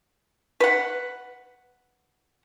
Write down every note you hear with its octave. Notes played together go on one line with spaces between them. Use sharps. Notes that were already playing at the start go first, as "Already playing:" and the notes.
B4 F#5